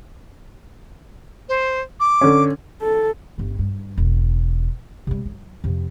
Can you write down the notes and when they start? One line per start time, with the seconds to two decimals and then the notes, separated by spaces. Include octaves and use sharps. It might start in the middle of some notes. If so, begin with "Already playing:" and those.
1.49 C5
2.00 D6
2.21 D3 C#4
2.82 A4
3.38 G1 C#3
3.59 G2
3.97 E1
5.07 C3 G3
5.26 F#3
5.64 F2 C3